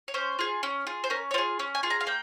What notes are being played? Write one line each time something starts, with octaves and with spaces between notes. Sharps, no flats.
C#5
C#4 C5
F4 G#4
C#4
F4 G#4
C5
C#4 A#4
C#5
F4 G#4 C5
C#4
G#5
F4 G#4
A#5
F5
A#3 G5